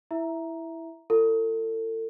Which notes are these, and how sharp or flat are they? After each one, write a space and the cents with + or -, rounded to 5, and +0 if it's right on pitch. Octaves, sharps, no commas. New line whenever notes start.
E4 +0 E5 +0 A#5 +5
F4 -35 A4 +35